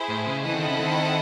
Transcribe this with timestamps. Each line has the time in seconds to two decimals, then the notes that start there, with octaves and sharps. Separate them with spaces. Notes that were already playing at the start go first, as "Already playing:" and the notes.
Already playing: E4 G#4 C5
0.09 A2
0.25 C#3
0.44 E3 C4 E4 A4 D#5 F#5
0.56 D#3
0.67 C#3
0.80 D#3